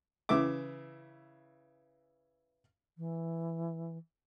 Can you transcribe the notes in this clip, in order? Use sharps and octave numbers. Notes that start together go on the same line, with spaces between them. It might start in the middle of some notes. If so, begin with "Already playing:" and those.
C#3 E3 E5 D6
E3